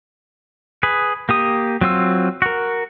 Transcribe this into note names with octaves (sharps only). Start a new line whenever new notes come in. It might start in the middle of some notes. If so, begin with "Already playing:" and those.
G#4 B4
A#3 G4 D#6
F#3 C4 F4 E6
F#4 A#4